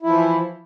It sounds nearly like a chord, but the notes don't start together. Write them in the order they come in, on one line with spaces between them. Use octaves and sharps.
E4 F3 E3